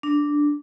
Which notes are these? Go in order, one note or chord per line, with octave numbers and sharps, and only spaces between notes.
D4